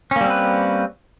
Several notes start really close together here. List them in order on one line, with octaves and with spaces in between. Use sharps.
C#4 A#3 G3 C4 B4